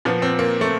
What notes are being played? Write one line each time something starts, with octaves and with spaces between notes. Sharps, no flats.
A#2 F3 B3
C4
A#3
A3